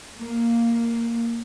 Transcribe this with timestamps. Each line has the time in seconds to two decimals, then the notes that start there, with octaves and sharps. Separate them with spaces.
0.17 A#3